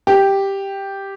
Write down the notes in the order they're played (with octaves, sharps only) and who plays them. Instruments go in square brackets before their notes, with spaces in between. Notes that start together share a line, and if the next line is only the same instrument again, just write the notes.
[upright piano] G4